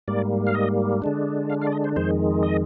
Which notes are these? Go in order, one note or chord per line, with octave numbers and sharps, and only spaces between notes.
G#2 G3 A#3 D5
F5
D#5
D3 G#3 D4
F5
F5
D5
D#5
C5
F2 D#3 G#3 C5
D#5